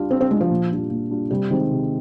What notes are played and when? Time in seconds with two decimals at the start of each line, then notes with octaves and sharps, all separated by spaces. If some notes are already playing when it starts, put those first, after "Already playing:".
Already playing: G3 D4 F4
0.11 G3 C4
0.21 C4
0.30 G#3 D4 F4
0.41 F3
0.50 A#2
0.71 G3 D4 F4
0.90 A#2
1.10 G3 D4 F4
1.30 C3 G3
1.50 D#3 G#3 C4 D#4
1.71 C3